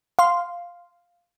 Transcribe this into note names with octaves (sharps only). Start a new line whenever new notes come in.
F5 C6